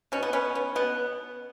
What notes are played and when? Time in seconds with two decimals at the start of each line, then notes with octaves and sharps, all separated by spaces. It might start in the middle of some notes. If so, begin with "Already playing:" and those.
0.12 B2 C#4
0.22 B3
0.33 B3 C#4
0.55 B3
0.75 B2 B3